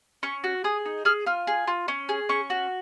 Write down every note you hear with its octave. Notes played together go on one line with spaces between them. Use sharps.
C#4 C#6
F#4
G#4 D#6
D#4
G#4 F6
F4 F6
G#4
F4
C#4
G#4
C#4 C#6
F#4